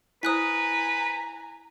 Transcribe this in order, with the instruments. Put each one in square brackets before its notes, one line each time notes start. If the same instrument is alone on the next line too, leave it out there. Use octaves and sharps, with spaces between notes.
[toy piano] E4 C5 [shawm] B4 [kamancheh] G#5 A#5 [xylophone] D#6 F#6 B6